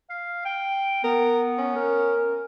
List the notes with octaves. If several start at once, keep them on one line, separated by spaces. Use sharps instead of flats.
F5
G5
B3 A#4
C#4
A#4